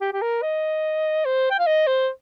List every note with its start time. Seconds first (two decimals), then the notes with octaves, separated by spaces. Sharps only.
0.01 G4
0.13 G4
0.22 A#4
0.42 D#5
1.25 C5
1.51 G5
1.59 F5
1.67 D#5
1.87 C5